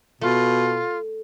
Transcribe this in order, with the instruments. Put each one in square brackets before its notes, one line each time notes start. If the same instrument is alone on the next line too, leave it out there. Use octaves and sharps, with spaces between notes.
[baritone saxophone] B2 [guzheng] A3 [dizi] F4